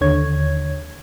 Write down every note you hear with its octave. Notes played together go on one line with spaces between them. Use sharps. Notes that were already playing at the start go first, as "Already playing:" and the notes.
D#2 D3 C#5 G#6